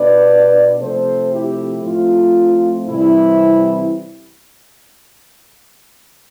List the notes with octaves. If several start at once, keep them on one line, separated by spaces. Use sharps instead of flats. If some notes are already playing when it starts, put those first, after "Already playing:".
Already playing: B2 B3 D4 B4 D5
C3 F3 A3 C4 A4 C5
E4 G4
A2 F3 A3 C4 F4
C3 E3 G3 C4 E4